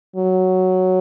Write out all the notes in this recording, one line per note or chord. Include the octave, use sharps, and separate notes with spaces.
F#3